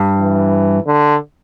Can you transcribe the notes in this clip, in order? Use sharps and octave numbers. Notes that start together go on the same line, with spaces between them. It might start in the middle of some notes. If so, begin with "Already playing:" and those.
Already playing: G2
E3
D3